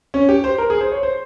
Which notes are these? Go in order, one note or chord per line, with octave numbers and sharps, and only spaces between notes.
C#4
G4
C5
A#4
G#4
C5
C#5
C5